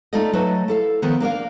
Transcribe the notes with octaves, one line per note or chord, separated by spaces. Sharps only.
A3 D#4 F4 A4 D5 D#5
F#3 A3 B4 D#5
E4 A4 F5
D#3 F3 B3
A#3 D4 A#4 F5